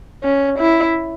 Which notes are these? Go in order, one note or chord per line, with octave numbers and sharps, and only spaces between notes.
C#4
E4